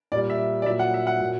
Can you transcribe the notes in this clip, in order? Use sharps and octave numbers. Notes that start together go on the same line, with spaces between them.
A#2 G3 D5
E5
D5
A#2 F#3 E5
F#5
E5
F#5
A#2 F#3